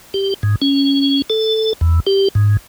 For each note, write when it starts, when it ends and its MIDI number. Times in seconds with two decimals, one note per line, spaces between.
0.14 0.34 67
0.43 0.56 44
0.62 1.22 61
1.30 1.73 69
1.81 2.00 40
2.07 2.28 67
2.35 2.57 44